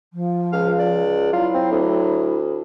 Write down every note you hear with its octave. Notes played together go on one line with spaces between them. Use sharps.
F3
C#2 F5
D5
F#3 E4 F4
C4
D2